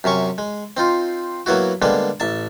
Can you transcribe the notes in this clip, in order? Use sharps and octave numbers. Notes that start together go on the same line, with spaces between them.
F#2 C3 C#4 C#6
G#3
C4 D#4 F4
F#3 A#3 B3 E4 F#4
D3 G3 G#3 A#3 B3
A1 E5 A5